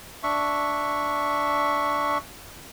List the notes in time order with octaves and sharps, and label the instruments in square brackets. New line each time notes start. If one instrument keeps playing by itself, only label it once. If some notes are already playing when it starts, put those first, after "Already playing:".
[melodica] D4 E5 C#6